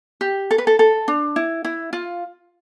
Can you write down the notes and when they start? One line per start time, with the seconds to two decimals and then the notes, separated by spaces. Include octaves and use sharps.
0.21 G4
0.51 A4
0.58 B4
0.67 A4
0.79 A4
1.08 D4
1.36 E4
1.64 E4
1.93 F4